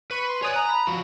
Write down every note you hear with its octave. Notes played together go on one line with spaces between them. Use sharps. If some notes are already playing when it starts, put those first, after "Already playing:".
B4 B5 C#6 D#7
C6
C#5 D5 G#5 D#6 F#6
A#5
B5
F3 F#4